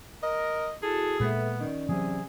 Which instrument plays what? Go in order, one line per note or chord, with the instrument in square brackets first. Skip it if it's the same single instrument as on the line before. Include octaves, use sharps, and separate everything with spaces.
[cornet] A#4 [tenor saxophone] D#5
[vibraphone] E4 F#4 [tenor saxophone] G#4 [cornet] A4
[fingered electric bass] A#2 G#3 [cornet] B3 [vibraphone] A4 B4 E5
[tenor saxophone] D#3 [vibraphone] C#4 D5
[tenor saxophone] C3 [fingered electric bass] E3 F#3 C4 [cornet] G#4